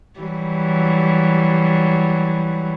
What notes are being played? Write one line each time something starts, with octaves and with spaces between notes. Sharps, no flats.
E3 F#3 G3